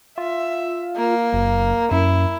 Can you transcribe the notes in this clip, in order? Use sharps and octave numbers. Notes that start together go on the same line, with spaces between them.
F4 E5
A#3
F#1
F#2 E4